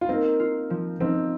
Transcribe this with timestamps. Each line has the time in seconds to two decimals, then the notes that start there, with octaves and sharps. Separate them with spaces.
0.01 F4
0.09 A#3 C4 D#4
0.40 F4
0.70 F3
1.00 F3 C4 D#4